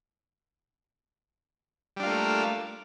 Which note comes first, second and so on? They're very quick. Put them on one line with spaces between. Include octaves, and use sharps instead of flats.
G3 D4 F4 A#3 A3